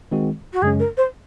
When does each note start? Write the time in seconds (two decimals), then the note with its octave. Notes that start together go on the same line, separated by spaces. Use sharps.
0.11 D#3 G#3 C4 F#4
0.53 F#4
0.62 F#2 C#3 G#3 C#4 G#4
0.79 A#4
0.97 C5